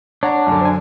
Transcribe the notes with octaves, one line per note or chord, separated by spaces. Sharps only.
D4 C#5 F#5 A#5
F#2 D3
C5 G#5